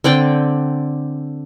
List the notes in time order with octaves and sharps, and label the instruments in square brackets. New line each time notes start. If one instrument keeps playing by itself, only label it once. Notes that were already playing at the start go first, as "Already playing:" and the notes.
[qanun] D3 C4 D5 G5